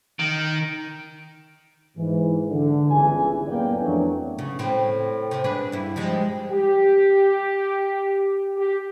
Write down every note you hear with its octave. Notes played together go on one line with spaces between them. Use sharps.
D#3
G#2 E3
D3
G1 C#2 E3 G#4 G#5
F#2 A2 A#3 B3 D5 G5
F2 E3 F#3 A3 B3 D4
C#3
A2 C4
C3
D4 G#4 B4
G2 E4
F3 G3 G#3
G4
G4